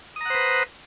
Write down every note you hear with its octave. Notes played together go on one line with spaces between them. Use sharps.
B4 C5 F#5 A#5 D#6